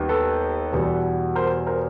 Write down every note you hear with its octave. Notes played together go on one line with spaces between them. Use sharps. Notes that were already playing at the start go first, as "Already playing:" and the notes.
Already playing: D#2 D#3 G3 B3
A4 B4
E2 B2 G3 B3
A#4 C5
A#4 C5